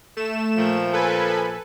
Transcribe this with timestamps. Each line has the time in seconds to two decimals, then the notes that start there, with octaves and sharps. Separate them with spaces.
0.17 A3 E7
0.56 A#2 F3
0.93 A4 B4 G#5